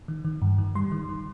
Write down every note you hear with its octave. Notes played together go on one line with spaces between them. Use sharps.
D#3
D#3
G2
D#3
G3 C6
D#3
D#3